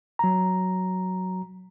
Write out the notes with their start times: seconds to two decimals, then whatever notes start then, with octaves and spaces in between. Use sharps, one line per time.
0.19 F#3 A#5